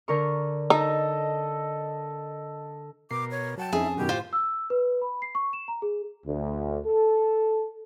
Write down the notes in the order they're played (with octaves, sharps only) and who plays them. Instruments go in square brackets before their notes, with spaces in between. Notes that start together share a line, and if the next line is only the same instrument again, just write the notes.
[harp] D3 A#4 C#6
[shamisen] D#4 [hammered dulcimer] A4 D#5
[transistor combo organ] B2 A#4 [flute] D6 [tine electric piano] C7
[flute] C#5
[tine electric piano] F#3 F#5 G5 [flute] A5
[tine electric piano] F2 C#4 [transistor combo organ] D#4 E4 E5 [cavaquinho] G#4
[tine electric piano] F#2 B2 D#3 [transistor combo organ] F#4 [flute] G4
[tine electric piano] A2 [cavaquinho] F4 C5
[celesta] E6
B4
B5
C7
C#6
E7
A#5
G#4
[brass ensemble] D2
A4